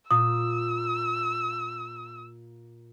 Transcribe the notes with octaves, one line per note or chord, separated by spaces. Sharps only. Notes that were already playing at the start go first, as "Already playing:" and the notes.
A#2 D#6 E6